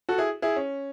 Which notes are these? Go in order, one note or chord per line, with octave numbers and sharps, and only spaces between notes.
F#4 A4
E4 G#4
E4 G#4
C#4